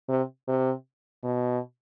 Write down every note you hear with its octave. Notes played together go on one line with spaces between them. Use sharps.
C3
C3
B2